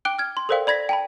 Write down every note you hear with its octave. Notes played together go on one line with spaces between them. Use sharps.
G5 D6 F#6 D7 G7
F6 G#6
C6
A4 A#4 C5 D5 F5 G5
D5 B5 G#6 A#6 B6
G5 A5 B5